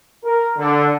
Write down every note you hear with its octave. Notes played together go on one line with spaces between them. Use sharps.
A#4
D3